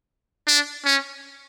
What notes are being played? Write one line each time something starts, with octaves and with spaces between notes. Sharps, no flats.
D4
C#4